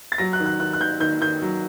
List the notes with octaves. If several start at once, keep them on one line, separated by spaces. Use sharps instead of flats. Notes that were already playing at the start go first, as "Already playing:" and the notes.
A6
F#3 A#6
F#6
D#3
F#6
D#3 F#6
F#6
D#3 G6
D#3 G6
D#3 G6
F#3